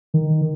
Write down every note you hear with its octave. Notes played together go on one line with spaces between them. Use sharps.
D#3